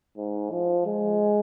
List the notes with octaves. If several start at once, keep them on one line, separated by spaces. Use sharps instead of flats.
G#2
F3
G#3